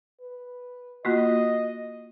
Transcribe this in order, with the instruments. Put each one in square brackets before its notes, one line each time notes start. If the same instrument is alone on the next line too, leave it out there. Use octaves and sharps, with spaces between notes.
[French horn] B4
[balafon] A#3 F4 F#4 [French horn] D#5